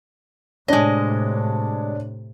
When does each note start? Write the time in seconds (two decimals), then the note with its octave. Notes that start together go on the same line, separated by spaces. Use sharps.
0.68 A2 C3 G#3 D4 C#5 D#5